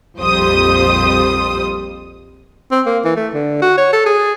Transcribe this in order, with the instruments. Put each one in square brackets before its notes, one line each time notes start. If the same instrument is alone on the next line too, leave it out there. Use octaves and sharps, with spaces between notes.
[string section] A#1 F2 G3 C5 D#6
[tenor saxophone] C4
A#3
E3
A3
D3
F#4
C#5
A4
G#4